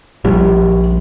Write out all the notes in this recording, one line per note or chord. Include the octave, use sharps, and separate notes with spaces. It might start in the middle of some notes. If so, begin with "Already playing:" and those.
A#1 G3